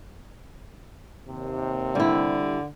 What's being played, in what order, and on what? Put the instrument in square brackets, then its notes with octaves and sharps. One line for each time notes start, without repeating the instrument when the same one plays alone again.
[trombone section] D#2 C3
[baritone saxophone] D3 [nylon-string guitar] G3 E4